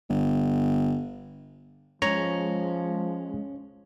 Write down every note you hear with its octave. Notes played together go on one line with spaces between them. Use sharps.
G1
F3 G#3 C#4 C#5 A#5